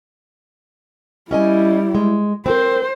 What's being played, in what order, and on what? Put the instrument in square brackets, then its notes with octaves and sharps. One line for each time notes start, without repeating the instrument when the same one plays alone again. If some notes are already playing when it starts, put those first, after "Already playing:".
[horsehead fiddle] G3 E4 [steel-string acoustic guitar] C#4 D#5 G#5
[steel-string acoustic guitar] G#3
[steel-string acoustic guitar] C4 A#4 [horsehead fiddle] C5